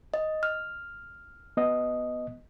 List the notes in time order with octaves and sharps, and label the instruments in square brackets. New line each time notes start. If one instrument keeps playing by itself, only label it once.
[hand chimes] D#5
F6
[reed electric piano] B3 D#5